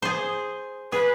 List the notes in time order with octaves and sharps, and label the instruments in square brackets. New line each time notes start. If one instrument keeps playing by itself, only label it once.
[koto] G#4 C5
[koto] G#4 [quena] B4